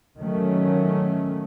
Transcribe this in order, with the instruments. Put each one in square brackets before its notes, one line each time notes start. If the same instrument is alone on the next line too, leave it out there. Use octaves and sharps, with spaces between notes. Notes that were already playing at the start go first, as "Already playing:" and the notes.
[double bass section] D#3 F#3 A3 C#4